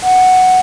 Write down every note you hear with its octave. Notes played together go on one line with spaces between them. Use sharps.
F#5